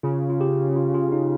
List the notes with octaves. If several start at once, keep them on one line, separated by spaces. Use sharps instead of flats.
C#3 F4
F4
G4
F4
F4
D#4